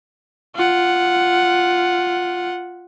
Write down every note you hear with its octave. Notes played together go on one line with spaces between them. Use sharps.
F4 F#5